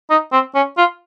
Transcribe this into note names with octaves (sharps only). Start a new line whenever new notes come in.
D#4
C4
C#4
F4